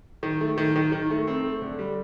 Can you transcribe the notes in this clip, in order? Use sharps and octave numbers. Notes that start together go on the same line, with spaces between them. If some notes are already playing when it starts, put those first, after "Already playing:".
D#3
A3
D#3
D#3
D#3
A3
C4
A3
D3
G3